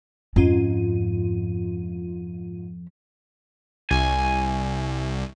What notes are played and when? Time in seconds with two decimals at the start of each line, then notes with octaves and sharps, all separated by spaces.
0.36 F2 G#2 C#4 F4 D#7
3.91 C2 G#5